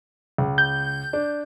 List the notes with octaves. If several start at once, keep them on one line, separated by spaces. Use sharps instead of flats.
C#2
G6
D4